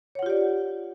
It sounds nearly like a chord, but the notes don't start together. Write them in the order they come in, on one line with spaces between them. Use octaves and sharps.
C#5 F#5 F4 G4 D5